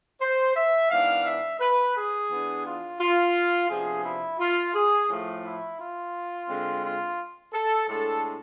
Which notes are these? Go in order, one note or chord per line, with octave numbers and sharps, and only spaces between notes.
C5
E5
G#2 E3 B3 D4 F5
E5
B4
G#4
E3 B3 D4
F4
F4
C3 F3 B3 D4 G#4
E4
F4
G#4
A2 F3 A3
E4
F4
D3 G#3 C4
F4
A4
A2 G#3 D4 A4